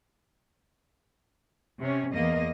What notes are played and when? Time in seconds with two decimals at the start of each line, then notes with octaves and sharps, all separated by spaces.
1.80 C3 C#4
2.13 E2 A#3 D#5